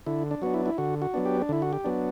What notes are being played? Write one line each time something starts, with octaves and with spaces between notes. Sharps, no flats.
D3 E4
D4
F#3 B3 D4 F#4
E4
E4
D3 F#4
F#4
F#3 B3 D4
G4
D4
D3 E4
F#4
G4
F#3 B3 D4